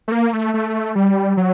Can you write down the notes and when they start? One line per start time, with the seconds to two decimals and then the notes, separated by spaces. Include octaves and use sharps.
0.08 A3
0.12 A#3
0.33 A3
0.54 A3
0.96 G3
1.37 F#3